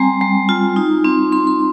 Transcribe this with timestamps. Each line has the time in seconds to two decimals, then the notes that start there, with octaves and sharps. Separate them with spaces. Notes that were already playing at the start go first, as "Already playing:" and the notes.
Already playing: G3 C4 G#5 A#5
0.21 G3
0.49 F4
0.76 D#4
1.05 C4
1.32 C4 C6
1.47 C6